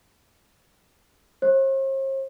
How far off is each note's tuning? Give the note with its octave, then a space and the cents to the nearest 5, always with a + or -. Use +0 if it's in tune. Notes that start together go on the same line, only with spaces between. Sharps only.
C5 +45